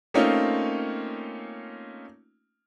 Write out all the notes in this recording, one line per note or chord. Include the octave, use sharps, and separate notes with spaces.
A3 A#3 C4 C#4 D#4 F4